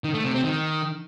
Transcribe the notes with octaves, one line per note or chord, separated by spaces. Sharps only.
D#3
A3
C3
C4
D#3